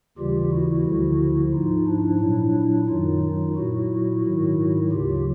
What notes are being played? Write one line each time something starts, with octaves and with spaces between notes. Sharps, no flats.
D#2 C#3 E3 G3 F4 G4
E4 F#4
D2 D3 F3
G#2 F3 D#4 F4
D4 E4
A#2 F#3 D4 E4
F#2 D#3 F#3 D#4 F4
D#4 F4
A#2 F#3 E4 F#4
G#2 D#3 F#3
D2 C#3 F#3 F4 G4